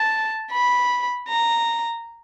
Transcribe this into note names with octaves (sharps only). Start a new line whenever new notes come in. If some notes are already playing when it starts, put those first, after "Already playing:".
Already playing: A5
B5
A#5